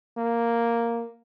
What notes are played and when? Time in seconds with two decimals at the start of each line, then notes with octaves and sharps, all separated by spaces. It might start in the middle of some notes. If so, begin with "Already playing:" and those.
0.17 A#3